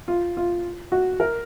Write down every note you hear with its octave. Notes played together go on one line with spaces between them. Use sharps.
F4
F4
F#4
A#4